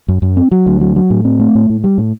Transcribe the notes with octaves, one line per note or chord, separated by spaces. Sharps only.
F#2
F#2
C4
F#3
D2
F#3
F#3
A2
C4
A3
A2
A2
G3
A2